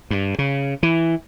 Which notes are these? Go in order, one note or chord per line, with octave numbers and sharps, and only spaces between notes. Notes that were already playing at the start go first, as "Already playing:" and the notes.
G2
C#3
E3